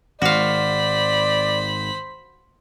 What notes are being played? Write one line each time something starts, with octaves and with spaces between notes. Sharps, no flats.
G#1 F#4 C5 D5 F5 B5